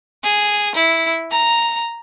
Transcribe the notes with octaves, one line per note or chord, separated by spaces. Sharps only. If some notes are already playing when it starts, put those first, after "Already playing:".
G#4
E4
A#5